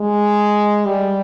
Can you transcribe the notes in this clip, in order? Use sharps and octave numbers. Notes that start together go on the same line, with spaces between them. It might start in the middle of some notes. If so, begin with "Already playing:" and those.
Already playing: G#3
G3